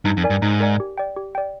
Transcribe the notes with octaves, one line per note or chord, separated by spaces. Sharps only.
G2 D#4
F2
A#4 D5 G#5
G2
G#2 D#4
A#4 D5 G#5
G4
D5 G5
G4
D5 G5